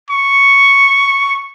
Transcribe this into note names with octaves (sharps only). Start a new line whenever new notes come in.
C#6